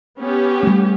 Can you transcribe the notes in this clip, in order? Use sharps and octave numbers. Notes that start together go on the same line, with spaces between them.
B3 C#4 G4
G3 A3